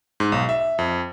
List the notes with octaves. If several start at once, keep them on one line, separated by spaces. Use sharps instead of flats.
G#2
B1
E5
F2